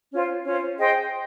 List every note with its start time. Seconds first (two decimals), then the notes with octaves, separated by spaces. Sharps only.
0.11 C#4 F4 C5
0.45 C#4 F4 C5
0.79 G#4 C5 D#5 G5